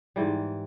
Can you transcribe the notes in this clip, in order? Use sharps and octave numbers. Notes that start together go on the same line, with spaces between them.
G#2 E3 G3